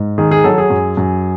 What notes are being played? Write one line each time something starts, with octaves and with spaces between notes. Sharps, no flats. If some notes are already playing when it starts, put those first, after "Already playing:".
Already playing: G#2
D#3 G#4
G#4
F#3 A4
G#4
F#2
F#2